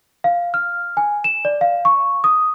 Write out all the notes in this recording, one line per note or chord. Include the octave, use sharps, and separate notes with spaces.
F5
F6
G#5
E7
D5
F5
C#6
D#6